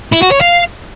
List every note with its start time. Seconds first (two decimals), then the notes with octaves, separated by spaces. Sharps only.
0.12 E4
0.22 F#4
0.31 C#5
0.41 F5